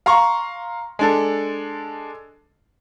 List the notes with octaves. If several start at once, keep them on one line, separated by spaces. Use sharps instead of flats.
F5 A#5 C6 C#6
G#3 D4 A4